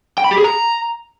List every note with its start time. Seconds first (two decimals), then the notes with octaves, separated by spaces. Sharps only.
0.18 G5
0.24 B5
0.31 G4
0.38 G#4
0.44 A#5